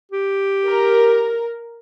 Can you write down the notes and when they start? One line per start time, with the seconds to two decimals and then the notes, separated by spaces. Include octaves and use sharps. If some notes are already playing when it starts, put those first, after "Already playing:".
0.12 G4
0.67 A#4